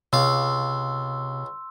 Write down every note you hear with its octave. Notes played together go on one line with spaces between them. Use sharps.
C#2 C3 F5 C6 E6